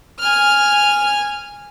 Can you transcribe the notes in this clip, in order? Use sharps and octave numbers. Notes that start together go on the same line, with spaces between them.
G#5 F6